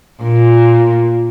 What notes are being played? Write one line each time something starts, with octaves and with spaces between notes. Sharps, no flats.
A#2